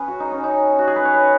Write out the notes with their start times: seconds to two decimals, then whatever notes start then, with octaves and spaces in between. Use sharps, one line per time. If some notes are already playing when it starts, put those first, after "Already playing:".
Already playing: C#4 G#4 B4
0.08 F#4
0.20 D#4
0.32 C#4
0.44 D#4
0.79 F#4
0.87 G#4
0.96 B4
1.05 C#5
1.14 B4